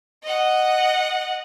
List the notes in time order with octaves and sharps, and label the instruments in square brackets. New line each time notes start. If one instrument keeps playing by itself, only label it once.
[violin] D#5 F#5